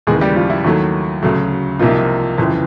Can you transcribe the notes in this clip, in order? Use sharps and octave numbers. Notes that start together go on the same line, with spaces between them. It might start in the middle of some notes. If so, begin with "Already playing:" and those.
D#2 C#3 E3 G#3 G#4
G3 G4
F3 F4
E4
D#2 D#3 F#3 A3 E4
D2 C#3 F#3 A3
C2 C3 F3 A#3 D#4 F4
G1 F2 C#3 E3